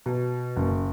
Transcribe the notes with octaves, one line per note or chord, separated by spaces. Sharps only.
B2
F#1